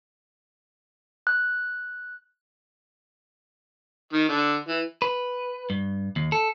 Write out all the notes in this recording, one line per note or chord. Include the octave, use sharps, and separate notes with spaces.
F#6
D#3
D3
E3
B4
G2
D#2
A4